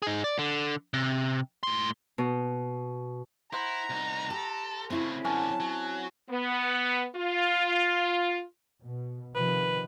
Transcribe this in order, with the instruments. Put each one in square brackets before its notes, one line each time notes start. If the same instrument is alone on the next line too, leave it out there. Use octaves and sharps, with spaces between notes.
[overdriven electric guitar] D#4 G#4
D5
D3
C3
A2 C6
[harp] B2
[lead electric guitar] E4 [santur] C5 F#5 B5 [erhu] A#5
[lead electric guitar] C2 D#4
[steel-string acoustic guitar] G4 [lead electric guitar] A4
[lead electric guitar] C#3 A3 [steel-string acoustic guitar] C4 E4 G#4
[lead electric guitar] F#2 D3 [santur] C#4 F#5 [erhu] A5
[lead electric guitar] F#3
[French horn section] B3
F4
[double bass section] B2
[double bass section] C3 D#3 F3 [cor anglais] B4